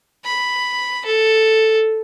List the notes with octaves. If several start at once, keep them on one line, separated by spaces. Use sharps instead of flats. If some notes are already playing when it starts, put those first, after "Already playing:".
B5
A4